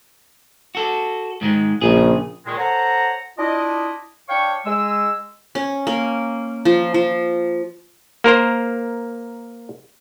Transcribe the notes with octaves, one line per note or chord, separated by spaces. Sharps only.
F#4 A4
G#2 D#3 G#3
A#1 C#3 G#4
A#2 D#3 G#3
A4 C5 C#5 F#5 A#5
D4 E4 F4 D#5
D4 C#5 F5 G5 C#6
G#3 E6
C#4
A#3
F3
F3
A#3 A#4 C5 A#5